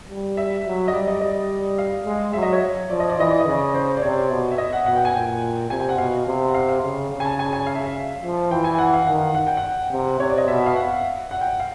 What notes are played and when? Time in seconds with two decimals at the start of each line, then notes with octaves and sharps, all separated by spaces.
0.09 G3
0.37 E5
0.66 F#3
0.88 D#5
0.93 G3 D5
1.08 D#5
1.21 G3 D#5
1.78 F5
2.05 G#3
2.33 F#3 E5
2.43 D#5
2.53 C#5
2.89 F3 D5
3.00 D#5
3.10 D5
3.18 E3 D#5
3.30 D5
3.40 D#5
3.46 C#3 D5
3.74 C5
3.97 D5
4.02 C3 C#5
4.31 B2
4.52 E5
4.58 D#5
4.73 F#5
4.86 B2 F#5
4.96 G5
5.05 G#5
5.14 A#2 G5
5.70 C3 G#5
5.80 G5
5.89 F#5
5.98 B2 F5
6.27 C3
6.48 F#5
6.54 F5
6.69 F5
6.82 C#3
7.10 C#3
7.20 G#5
7.25 A5
7.39 G#5
7.46 A5
7.53 G#5
7.67 F5
7.75 E5
7.86 F5
8.23 F3
8.51 E3 G5
8.64 G#5
8.78 F#5
8.94 F5
9.07 D#3 F#5
9.35 F#5
9.47 G5
9.57 F#5
9.91 C3
10.19 C3 C#5
10.30 D5
10.38 D#5
10.47 B2 E5
10.66 F5
10.76 F#5
11.31 F#5
11.41 G5
11.60 F5